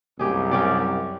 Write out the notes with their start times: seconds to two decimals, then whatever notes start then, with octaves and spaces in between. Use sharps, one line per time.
0.19 C2 F#2 G4 G#4
0.51 C#4 G4 D5